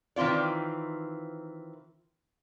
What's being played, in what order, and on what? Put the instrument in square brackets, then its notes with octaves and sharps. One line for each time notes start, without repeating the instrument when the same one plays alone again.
[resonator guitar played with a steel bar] D#3 E3 C4 F4 D5